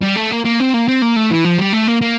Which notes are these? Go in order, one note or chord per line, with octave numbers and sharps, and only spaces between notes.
G3
A3
A#3
A#3
C4
A#3
C4
A#3
A3
E3
F3
G3
A3
A#3
A#3